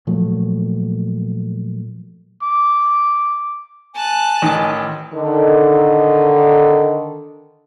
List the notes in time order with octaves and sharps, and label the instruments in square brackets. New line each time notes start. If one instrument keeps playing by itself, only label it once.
[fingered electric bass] A#2 F3 F#3 A3
[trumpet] D6
[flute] G#5 [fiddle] A5 F#6
[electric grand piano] A1 [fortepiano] D#3
[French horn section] D3 D#3